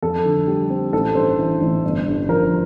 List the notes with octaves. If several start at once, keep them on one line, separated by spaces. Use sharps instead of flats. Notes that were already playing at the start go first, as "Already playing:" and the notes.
F2 A4
D3
G3
C4
A1 A4
G2 C5
E3
A1
G1
G2
F3 A#4